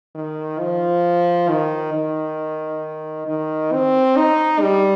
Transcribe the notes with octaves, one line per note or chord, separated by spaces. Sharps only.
D#3
F3
D#3
D#3
D#3
C4
D#4
G3